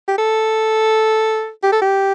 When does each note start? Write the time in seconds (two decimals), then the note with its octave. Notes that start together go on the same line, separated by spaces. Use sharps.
0.08 G4
0.18 A4
1.63 G4
1.72 A4
1.82 G4